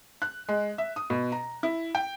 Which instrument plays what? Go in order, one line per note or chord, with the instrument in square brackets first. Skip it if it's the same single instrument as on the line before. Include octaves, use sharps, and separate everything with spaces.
[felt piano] F#6
G#3
E5
D#6
B2
A#5
E4
G5